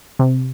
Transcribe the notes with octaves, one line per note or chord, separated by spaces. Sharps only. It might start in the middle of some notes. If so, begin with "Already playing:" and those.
C3